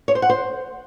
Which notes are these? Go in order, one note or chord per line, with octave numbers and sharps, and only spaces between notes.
C#5
C5
F#5
C5